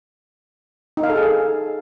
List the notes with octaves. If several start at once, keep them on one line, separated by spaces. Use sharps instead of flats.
D#4
F5
A4
G#4